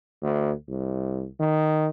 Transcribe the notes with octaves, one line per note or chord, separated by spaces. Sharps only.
D2
C2
D#3